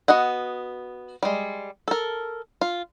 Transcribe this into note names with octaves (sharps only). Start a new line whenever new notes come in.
B3 F#4 D#5 F#5
G3 G#3
A4 A#4
F4